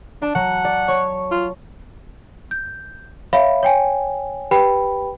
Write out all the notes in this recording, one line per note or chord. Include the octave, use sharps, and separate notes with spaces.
D4 A5
F#3 F#5
D5
C#5 C#6
F4
G6
C#5 E5 F5 B5
C#5 G5 G#5
G4 B4 G5 B5